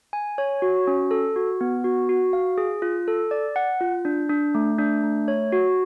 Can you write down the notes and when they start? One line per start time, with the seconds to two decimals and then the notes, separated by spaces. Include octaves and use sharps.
0.13 G#5
0.38 C#5
0.62 F#4
0.87 C#4
1.11 A4
1.36 F#4
1.61 B3
1.84 F#4
2.09 F#4
2.33 F5
2.58 G#4
2.82 F4
3.08 A4
3.31 D5
3.56 F#5
3.81 F4
4.05 D4
4.29 D4
4.55 A3
4.78 D4
5.03 A3
5.28 C#5
5.52 F#4